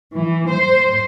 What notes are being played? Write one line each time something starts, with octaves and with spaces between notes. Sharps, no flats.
E3
C5